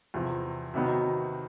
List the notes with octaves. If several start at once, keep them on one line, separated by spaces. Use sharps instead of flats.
E2 C3 F3
C3 D#3 F#3 B3 D#4